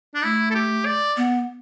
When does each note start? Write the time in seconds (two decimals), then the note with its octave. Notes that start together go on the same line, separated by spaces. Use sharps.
0.15 D4
0.24 A3 E4
0.51 A4
0.55 G4
0.86 D5
1.17 B3